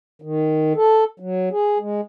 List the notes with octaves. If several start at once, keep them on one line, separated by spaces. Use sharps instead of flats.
D#3
A4
F#3
G#4
G#3